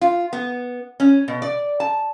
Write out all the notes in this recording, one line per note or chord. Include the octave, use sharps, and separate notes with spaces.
F4
B3
C#4
B2
D5
A5